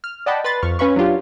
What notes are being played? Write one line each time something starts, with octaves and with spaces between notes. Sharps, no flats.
F6
D5 D#5 F#5 G5 A5 B5
B4 B5 C6 A6
F2 C#6 F6
C#4 B4 F5 B5 C#6
F#3 D4 F4 G4